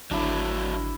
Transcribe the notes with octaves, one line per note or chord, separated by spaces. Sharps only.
G#1 D3 F#3 D4 E4